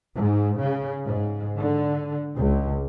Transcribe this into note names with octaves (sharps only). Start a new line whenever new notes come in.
G#2
C#3
G#2
D3
C#2